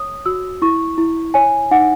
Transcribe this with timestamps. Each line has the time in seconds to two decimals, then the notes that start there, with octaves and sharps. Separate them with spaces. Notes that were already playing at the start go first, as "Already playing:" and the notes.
Already playing: C#5 D#6
0.26 F#4 E6
0.62 E4 C#6
0.98 E4
1.34 C#5 G#5
1.71 D#4 F#5